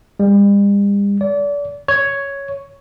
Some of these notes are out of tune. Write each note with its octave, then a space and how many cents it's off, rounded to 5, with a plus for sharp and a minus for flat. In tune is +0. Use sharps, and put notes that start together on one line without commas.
G3 +45
D5 -30
C#5 +5